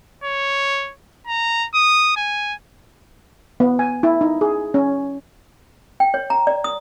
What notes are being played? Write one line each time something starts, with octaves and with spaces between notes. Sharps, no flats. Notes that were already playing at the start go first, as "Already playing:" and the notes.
C#5
A#5
D#6
G#5
B3
G#5
E4
D#4
G#4
C#4
G5
C#5
A#5
D5
D#6